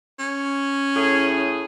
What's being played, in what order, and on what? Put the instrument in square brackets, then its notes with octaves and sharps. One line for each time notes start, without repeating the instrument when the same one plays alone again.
[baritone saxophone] C#4
[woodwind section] A2 G#4